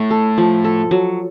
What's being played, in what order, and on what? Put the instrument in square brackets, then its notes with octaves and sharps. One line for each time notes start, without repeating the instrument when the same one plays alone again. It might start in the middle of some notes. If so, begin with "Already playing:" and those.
Already playing: [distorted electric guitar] A2 [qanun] A3
[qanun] A4
F3
A4
F#3